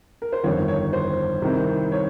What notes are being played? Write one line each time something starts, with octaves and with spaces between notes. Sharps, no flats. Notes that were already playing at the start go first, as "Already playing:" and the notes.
A#4
C5
G1 F2 D#3 C#5
C#5
C5
C2 C3 D#3
C#5